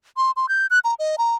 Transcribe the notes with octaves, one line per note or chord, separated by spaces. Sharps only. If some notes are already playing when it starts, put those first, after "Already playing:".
C6
C6
G6
F#6
A#5
D#5
A#5